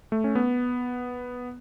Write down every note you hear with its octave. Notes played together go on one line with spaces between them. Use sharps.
A3
C#4
B3